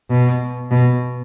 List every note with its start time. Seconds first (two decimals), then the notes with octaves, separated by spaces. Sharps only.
0.10 B2
0.71 B2